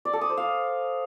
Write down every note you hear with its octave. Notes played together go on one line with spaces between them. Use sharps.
D5
A4
D#6
C5
F5